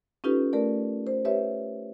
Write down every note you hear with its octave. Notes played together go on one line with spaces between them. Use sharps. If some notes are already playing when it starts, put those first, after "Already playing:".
C#4 D#4 F4 G4 A4 B4
A3 A#4 D5
C5
G4 B4 C#5 E5